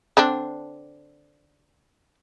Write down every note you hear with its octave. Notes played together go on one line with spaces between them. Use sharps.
D3 C4 D4